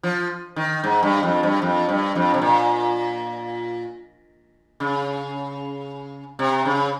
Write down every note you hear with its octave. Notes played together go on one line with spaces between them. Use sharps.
F3
D#3
G#2
G2
F2
G2
F2
G2
F2
C3
A#2
C#3
C3
C#3